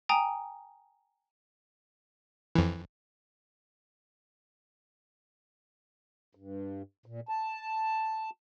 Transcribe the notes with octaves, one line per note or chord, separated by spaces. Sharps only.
G5 G#5 A#5 D#6
F2 E3
G2
A#2
A5